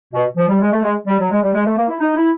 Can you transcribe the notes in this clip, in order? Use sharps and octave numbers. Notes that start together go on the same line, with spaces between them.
B2
F3
G3
G#3
A3
G#3
G3
F#3
G#3
G3
G#3
A3
A#3
E4
D#4
E4